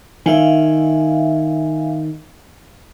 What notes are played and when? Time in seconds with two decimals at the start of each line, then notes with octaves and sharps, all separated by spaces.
0.26 D#3 E5 F5 G#5